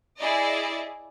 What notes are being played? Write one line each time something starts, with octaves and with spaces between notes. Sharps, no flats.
E4 G#4 D5 D#5